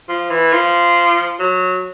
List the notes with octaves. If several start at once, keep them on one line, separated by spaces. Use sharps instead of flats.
F3
E3
F3
F#3